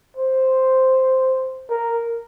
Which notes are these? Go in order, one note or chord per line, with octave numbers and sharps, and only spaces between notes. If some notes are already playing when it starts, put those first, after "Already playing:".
C5
A#4